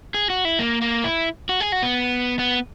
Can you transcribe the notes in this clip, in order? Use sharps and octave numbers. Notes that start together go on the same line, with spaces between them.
G#4
F#4
E4
A#3
A#3
E4
F#4
G#4
F#4
B3
B3